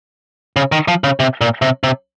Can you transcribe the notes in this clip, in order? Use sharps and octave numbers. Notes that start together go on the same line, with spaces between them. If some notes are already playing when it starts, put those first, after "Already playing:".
C#3
D#3
F3
C#3
C3
A#2
C3
C3